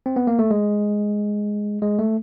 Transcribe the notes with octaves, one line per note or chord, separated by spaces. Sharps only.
C4
B3
A#3
A3
G#3
G#3
A3